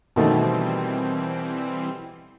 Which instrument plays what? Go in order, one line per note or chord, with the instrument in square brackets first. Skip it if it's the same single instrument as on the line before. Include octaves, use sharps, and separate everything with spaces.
[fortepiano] B2 D#3 A3 [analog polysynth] E3 G3 C4